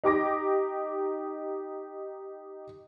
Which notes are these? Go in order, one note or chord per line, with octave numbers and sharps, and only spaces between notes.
D#4 G4 D6 A#6